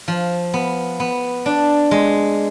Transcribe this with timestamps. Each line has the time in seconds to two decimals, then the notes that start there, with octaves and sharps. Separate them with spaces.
0.08 F3
0.54 B3
1.00 B3
1.46 D4
1.91 G#3